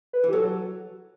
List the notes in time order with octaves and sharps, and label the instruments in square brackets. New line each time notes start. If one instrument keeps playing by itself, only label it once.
[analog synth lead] B4
[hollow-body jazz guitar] E3
[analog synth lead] G4
[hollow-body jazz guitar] F#3 [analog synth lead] A4